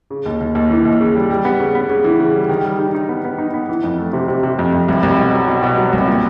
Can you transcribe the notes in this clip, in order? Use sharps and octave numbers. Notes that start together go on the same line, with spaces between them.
C#3
D#2
D#2
D#2
E3
D#2
C#3
G3
G3
B3
C#3
B3
C#3
E3
C#3
G3
D#3
G3
D#4
D#4
B3
B3
D#4
B3
E3
F2
A3
C3
C3
C3
F2
F2
C2
C2
B2
F#3
B2
B2
F#3
C2
A#2